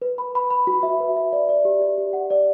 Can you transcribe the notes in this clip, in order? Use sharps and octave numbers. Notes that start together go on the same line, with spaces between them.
B4
B5
B5
B5
F#4
E5
B4
E5
D5
D5
G4
D5
G4
F#5
D5